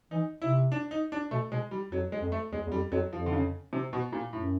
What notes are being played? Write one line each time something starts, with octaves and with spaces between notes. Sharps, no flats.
E3 D#4
C3 E4
D4
D#4
D4
B2 A3
B2 G#3
G3
F2 F#3
G#3
F2
A3
E2 G#3
E2
F2 G3
F2 F#3
F2 F3
D3
C#3
C3
B2
A#2
F#2 A2